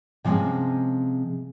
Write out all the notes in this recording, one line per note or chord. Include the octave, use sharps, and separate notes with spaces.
C3 F3 G#3 C4 C#4